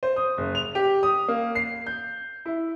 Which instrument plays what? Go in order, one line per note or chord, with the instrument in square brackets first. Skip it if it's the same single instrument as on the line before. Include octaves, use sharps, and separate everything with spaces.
[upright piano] C5
D#6
F#1
F7
G4
D#6
A#3
C7
G6
E4